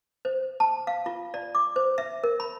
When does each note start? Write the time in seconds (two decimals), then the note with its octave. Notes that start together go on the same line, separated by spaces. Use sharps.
0.25 C5
0.60 A5
0.87 F5
1.06 F4
1.34 D5
1.55 D6
1.76 C5
1.98 E5
2.24 A#4
2.40 B5